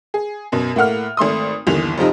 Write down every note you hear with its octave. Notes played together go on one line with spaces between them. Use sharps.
G#4
F#2 B2
A2 A#3 F#5 F6
G#1 A3 C6 D#6
G1 D#2 E3 F7
F1 C3 F3 D#4